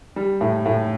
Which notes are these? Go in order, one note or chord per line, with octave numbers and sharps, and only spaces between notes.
G3
A2
A2